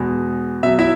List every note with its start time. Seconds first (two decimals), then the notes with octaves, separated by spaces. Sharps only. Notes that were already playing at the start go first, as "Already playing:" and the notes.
Already playing: E2 B2 G#3
0.63 B2 F#3 E5
0.79 E4 E5